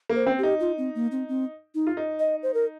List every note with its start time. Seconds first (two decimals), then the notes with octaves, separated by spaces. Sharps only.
0.10 A#3
0.15 C5
0.27 C4
0.38 G4
0.43 D#4
0.60 F4
0.78 C4
0.95 A#3
1.12 C4
1.29 C4
1.75 D#4
1.87 F4
1.97 D#4
2.20 D#5
2.43 C5
2.54 A#4